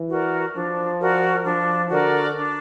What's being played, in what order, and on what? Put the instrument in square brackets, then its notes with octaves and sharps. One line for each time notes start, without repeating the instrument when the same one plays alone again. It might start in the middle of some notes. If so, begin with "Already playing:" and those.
Already playing: [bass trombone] E3
[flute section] F#4 A#4 D5
[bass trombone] F3 [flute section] D4
[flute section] F#4 A#4 D5
[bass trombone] F3 [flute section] D4
[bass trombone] D3 [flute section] F#4 A#4 D5
[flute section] D4